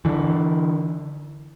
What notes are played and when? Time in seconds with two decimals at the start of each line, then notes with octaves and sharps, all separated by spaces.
0.05 D3 E3